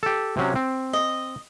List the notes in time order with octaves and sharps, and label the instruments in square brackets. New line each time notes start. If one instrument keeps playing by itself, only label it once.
[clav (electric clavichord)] G4 A4
C3 F#3 C#4
C4
[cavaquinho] D#5